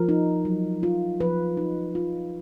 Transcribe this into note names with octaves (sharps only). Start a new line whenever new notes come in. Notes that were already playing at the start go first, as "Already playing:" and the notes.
Already playing: F3 A#4
D#4
F#3
F4
F3 B4
D#4
F4